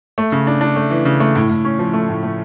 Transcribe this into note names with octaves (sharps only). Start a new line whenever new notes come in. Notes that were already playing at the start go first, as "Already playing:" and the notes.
A3
C#3
D4
D4
A3
E3
C#3
A3
A2
A2
C#4
F3
A3
A2
A3